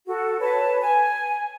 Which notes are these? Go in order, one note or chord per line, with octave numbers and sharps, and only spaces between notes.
F#4 A4
B4 C#5 A5
G#5